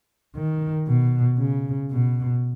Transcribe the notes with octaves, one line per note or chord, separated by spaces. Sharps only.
D#3
B2
C#3
B2